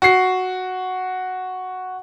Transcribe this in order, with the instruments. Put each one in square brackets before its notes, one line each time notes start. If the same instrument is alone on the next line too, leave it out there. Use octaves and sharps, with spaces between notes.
[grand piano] F#4 C7